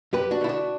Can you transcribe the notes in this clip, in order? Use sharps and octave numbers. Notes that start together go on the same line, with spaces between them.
F#2 G4 B4
D4 F#4
D3 A3 E4
D4 F#4